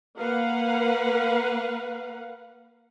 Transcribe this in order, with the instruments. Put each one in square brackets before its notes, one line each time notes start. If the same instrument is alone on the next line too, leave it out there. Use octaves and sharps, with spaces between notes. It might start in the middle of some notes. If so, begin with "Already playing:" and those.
[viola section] A#3 A#4 B4 F5 F#5